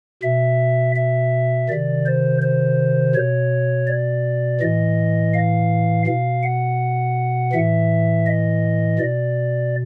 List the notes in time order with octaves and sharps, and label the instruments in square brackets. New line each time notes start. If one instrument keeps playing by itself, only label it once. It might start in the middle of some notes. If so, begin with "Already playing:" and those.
[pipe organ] B2 E5
E5
C3 D#3 D5
C5
C5
B2 C#5
D5
A2 E3 D#5
F5
B2 F5
F#5
A2 E3 E5
D#5
B2 D5